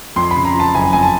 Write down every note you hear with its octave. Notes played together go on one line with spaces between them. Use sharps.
F2 C6
C#3 B5
A#5
F3
A5
F#1 G#5
F2 G#5
A5